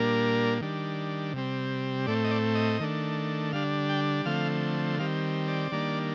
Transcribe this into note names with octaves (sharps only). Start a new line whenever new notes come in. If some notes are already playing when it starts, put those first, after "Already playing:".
Already playing: A#2 G3 A#3 D4 A#4
D#3 G3 D4
C3 G3 C4
A2 A3 C4 D5
D#5
D5
D#5
D#3 A3 D4
D3 G3 D4 F5
G5
D3 F3 A3 C4 F5
D#3 G3 C4 F5
D5
D#3 G3 A#3 D4